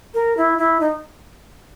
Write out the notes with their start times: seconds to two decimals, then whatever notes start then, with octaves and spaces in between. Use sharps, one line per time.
0.14 A#4
0.37 E4
0.58 E4
0.80 D#4